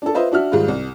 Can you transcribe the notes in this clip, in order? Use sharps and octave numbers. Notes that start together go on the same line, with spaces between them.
D4 A4
F4 B4 C5 D#5 E5
D4 F#4 E5 F6
G#2 D#3 G3 G#3 F4
C2